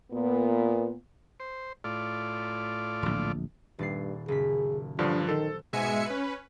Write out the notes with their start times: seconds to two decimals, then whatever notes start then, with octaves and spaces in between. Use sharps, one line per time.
0.12 A#2 B3
1.40 C5
1.84 A2 F4 D5
3.02 D1 A#1
3.79 D#1 G2 D5 C7
4.28 F#1 G#4 B6
4.99 G2 D3 F3 F#3 D4 F#5 F6
5.29 D#3 A4 C5
5.73 G#2 B2 G#3 E5 G#5 C#7
6.06 C#4 B4